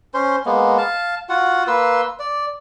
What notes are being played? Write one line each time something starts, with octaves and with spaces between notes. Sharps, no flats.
C#4 C5 C6
G#3 A#3 B3
F5 A5
F4 F#4 F#5
A#3 B4 C6 E6
D5